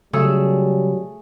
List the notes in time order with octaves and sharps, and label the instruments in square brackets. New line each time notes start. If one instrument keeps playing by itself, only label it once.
[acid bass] C#3 [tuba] F#3 [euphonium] G3 [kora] A3 G#4 A4